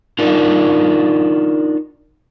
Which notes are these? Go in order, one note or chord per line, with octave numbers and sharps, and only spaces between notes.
D4 D#4 F4 A#4